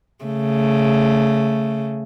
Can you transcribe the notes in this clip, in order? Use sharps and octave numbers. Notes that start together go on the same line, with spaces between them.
C#3 A3